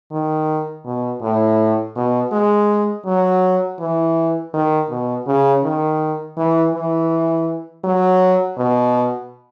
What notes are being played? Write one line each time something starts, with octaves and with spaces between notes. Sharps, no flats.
D#3
B2
A2
B2
G#3
F#3
E3
D#3
B2
C#3
D#3
E3
E3
F#3
B2